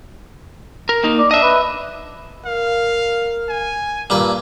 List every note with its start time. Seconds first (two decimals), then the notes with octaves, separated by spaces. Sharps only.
0.89 A#4
1.03 A#3 D#4
1.18 D5
1.31 D4 D#5 E5
1.42 B4
2.46 A#4 F5
3.49 G#5
4.10 G2 A#2 B4